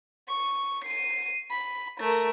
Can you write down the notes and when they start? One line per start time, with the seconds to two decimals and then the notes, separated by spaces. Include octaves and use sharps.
0.28 C#6
0.84 C7 D#7
1.51 B5
2.00 A3 A#4